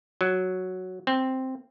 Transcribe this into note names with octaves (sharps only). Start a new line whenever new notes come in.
F#3
C4